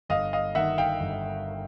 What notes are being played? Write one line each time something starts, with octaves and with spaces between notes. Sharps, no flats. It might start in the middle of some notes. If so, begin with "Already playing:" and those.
G1 D#5 F5
D#5 F5
D#3 E5 F#5
F5 G5
G1